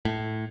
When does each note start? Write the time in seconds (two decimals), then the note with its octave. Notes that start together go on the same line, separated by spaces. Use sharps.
0.05 A2